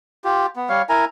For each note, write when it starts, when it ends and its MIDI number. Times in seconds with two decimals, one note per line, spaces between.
0.24 0.46 65
0.24 0.46 67
0.56 0.69 59
0.69 0.82 55
0.69 0.82 73
0.69 0.82 77
0.89 1.05 64
0.89 1.05 70
0.89 1.05 80
0.89 1.05 82